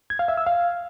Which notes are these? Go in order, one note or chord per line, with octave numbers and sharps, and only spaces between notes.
G#6
F5
E5
E6
F5